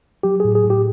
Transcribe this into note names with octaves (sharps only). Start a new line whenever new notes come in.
F#3 G4
A2 G#4
G#4
A2
G4